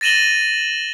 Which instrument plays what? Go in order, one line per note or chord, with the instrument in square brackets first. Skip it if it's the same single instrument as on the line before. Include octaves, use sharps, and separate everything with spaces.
[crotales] A6 A#6 D#7 E7 F#7 G7